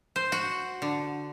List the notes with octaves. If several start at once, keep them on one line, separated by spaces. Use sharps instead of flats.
C5
F#4
D3